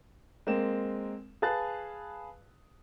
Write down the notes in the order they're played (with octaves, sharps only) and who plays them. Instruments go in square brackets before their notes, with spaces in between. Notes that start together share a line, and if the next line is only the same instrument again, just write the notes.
[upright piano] G#3 A#3 C4 E7
G#4 B4 F5 A5 F#6 A6